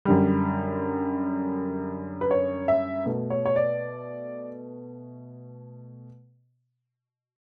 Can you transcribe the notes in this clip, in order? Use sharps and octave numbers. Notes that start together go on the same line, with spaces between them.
F#2 D3 G3
B4
C#5
E5
B2 A3
C#5
C#5
D5